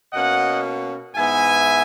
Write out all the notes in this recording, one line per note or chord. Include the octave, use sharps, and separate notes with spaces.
B2 A#3 C#4 D#5 F#5
G#2 E3 B3 E5 G#5